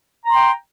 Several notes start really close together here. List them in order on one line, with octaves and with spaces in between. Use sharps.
A#5 C6 G5